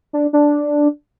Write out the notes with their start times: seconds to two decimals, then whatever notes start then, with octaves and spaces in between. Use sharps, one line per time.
0.13 D4
0.33 D4